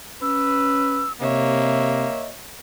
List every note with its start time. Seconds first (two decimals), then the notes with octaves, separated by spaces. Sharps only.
0.22 C#4 B4 E6
1.21 C3 A#3 C#5 D#5 E5